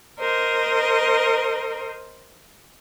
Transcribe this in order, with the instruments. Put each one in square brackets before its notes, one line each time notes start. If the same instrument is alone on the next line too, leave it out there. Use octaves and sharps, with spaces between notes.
[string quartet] A#4 C5 D#5